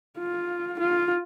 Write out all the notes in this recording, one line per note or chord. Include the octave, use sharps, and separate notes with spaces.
F4
F4